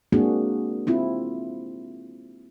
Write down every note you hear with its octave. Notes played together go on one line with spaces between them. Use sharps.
G#3 A#3 C4 D4 F#4 G#4
C4 E4 F4